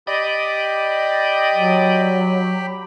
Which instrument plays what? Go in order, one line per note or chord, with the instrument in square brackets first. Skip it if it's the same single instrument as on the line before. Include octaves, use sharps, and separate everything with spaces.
[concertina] G4 G5 B5 [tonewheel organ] D5 D#5
[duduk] F#3